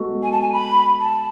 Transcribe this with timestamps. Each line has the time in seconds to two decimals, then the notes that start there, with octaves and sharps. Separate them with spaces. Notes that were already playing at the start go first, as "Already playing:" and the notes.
Already playing: G#3 B3 F#4 A4
0.23 G#5
0.32 A5
0.41 G#5
0.53 B5
1.00 A5